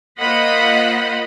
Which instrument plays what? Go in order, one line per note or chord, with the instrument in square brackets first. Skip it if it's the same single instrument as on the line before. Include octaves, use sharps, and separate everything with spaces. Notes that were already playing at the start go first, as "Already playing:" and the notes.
[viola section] A#3 F4 C5 D#5 F#5 B5